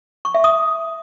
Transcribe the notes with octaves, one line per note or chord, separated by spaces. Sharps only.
C#6
E5
D#6